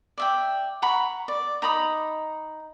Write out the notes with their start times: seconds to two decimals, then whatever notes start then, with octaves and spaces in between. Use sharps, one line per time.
0.18 D5 E5 G5
0.82 F#5 A#5 B5 C#6
1.28 D5
1.62 D#4 A#5 B5 D#6